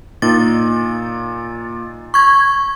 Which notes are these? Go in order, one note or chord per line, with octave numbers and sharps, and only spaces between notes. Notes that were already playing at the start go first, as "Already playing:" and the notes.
A#2 D#4 A6
C#6 G#6